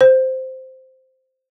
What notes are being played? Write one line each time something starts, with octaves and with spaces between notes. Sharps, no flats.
C5